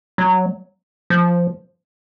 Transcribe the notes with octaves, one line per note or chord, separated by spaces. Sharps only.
F#3
F3